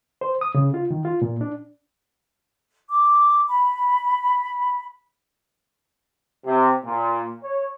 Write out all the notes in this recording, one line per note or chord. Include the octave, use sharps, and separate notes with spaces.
C5
D#6
C#3
F4
D#3
F4
A#2
D4
D6
B5
C3
A#2
C#5